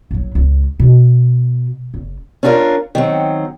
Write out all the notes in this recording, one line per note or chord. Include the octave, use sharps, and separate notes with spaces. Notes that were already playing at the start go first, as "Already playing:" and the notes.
A#1 F#3
C#2
B2
F#1
C#4 D4 F4 G#4 A#4
D#3 F#3 C4